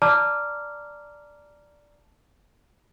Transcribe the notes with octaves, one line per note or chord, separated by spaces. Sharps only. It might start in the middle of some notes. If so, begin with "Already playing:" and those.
D5 A5 A#5 D6 F6